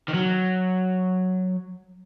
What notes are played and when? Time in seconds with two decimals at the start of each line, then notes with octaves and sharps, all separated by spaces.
0.08 D#3
0.14 F#3